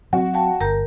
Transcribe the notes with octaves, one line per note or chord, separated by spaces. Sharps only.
F#3 C4 F#4
F5 G5 A5
G1 A#4 A#5 G6